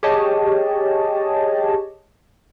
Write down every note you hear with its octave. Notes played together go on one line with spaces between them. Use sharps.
G4 G#4 C#5 D#5 A5